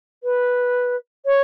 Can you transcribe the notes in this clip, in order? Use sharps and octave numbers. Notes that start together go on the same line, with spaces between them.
B4
C#5